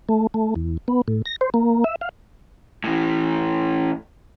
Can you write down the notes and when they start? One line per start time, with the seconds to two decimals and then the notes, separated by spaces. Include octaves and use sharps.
0.09 A3
0.34 A3
0.56 E2
0.88 B3
1.08 A2
1.26 A#6
1.41 C5
1.54 A#3
1.84 E5
2.01 F5
2.84 A2 E3